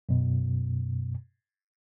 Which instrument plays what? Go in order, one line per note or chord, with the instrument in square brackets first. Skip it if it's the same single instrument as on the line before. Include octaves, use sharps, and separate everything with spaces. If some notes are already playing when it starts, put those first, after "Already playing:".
[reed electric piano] F#2 B2